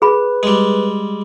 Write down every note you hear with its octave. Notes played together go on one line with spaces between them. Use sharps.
G#4 B4 B5
G3 G#3